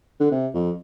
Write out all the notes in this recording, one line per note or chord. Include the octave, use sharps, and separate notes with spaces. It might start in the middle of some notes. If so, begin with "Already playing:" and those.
D3
C3
F2